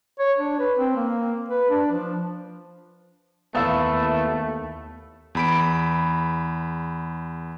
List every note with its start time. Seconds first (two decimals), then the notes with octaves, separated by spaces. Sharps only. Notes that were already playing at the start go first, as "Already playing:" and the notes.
0.19 C#5
0.38 D4
0.59 B4
0.78 C4
0.96 A#3
1.49 B4
1.70 D4
1.92 F3
3.55 D#2 A3 B3 E4 F5 E6 A6
5.35 E2 B5 D7